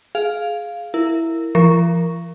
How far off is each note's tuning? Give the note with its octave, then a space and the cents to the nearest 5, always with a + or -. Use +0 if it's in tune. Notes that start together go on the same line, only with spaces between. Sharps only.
G#4 +15 F5 +0
E4 +0 A#4 -15
F3 -45 A#4 +0 C#6 +0